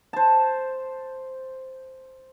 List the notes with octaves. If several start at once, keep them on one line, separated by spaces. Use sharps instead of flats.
C5 A5